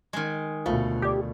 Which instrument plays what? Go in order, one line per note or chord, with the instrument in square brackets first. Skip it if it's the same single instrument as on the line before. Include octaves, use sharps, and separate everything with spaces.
[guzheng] D#3 G#3
[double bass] D2 B2 [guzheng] A3 [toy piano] F4 C5 F5
[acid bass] G4 [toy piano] D5 D#6